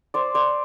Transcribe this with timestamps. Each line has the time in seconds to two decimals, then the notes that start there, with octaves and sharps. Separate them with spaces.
0.14 C5 D5
0.35 C5 D5